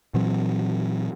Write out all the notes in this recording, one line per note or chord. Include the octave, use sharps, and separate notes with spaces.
A#2 E3 F#3 C4